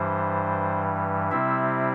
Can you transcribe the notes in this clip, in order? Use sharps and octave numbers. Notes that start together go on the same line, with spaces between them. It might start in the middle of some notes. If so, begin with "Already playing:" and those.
Already playing: G2 E3 G3 C5
C3 G3 C4 E4 E5